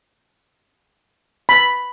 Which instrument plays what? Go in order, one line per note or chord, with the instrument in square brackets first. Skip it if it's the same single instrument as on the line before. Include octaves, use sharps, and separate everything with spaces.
[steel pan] B5